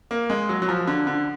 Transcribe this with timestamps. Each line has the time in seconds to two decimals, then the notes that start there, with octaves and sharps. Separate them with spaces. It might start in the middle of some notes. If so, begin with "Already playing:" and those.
0.11 A#3
0.30 G#3
0.49 F#3
0.62 F#3
0.69 F3
0.87 D3
1.07 D3